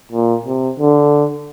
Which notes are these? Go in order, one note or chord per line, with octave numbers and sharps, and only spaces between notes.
A#2
C3
D3